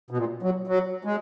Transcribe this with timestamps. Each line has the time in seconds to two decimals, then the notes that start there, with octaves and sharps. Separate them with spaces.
0.11 B2
0.17 A#2
0.43 F#3
0.67 F#3
1.05 G#3